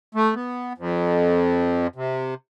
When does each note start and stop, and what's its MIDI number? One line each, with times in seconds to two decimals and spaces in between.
0.15 0.34 57
0.35 0.73 59
0.78 1.87 41
1.96 2.34 48